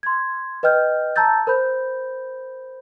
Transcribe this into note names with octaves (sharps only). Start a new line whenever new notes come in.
C6 G#6
B4 D#5 G5 F6 G6
A5 A#5 E6 G6 A6
A#4 C5 B5 G6